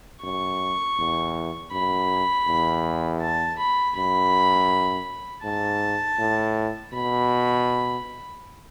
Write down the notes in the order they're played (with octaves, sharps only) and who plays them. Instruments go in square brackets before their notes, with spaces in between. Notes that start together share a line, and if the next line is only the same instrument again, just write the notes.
[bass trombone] F#2 [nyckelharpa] C#6
[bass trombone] E2
[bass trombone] F#2 [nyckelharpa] B5
[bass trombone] E2
[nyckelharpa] A5
B5
[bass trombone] F#2 [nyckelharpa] B5
[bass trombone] G#2 [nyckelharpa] A5
[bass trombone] A2
[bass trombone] B2 [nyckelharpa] B5